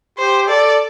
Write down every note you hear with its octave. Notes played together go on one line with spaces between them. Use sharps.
G4 C5
A4 D5